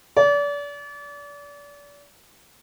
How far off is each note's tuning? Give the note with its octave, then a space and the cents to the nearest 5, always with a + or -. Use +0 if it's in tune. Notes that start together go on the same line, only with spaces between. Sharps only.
D5 -35